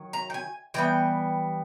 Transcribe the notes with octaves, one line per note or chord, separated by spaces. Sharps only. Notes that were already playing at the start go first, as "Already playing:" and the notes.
Already playing: D#3 F#3
A#5
G5
G#5
E3 G3 B3 G5